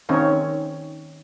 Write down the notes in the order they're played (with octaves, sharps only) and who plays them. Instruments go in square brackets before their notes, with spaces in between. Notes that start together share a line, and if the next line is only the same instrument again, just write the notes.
[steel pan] D#3 C4 C#4 D#4 C#5